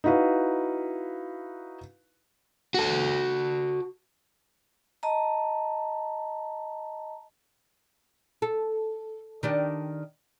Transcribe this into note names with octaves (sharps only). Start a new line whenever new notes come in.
D#4 E4 F#4 B4 F5
F#4 A4
D#5 A5 A#5
A4
D#3 D4 G4